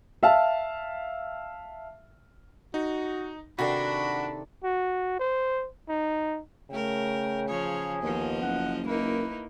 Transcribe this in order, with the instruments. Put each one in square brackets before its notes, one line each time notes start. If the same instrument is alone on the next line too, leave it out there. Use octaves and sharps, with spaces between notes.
[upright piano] E5 F5 A5
[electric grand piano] D#4 [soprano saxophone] F#4
[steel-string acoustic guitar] C3 D#3 A4 [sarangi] D4 [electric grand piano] F#4 [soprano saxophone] B5
[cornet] F#4
C5
D#4
[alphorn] C#3 [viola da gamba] A3 A#4 [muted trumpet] G5
[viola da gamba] F3 C#5 [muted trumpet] G#4
[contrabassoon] D#2 [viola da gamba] F3 D#5 [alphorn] B3
[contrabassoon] F#1 [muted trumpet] F#5
[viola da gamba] A#3 D#4 E4 [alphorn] A#4 [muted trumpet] B4